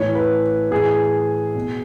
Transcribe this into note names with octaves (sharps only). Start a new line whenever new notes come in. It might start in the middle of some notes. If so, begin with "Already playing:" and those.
Already playing: A2 E3 C#5
B4
A2 E3 G#4
B2